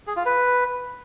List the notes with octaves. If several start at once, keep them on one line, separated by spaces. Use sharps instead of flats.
G#4
F4
B4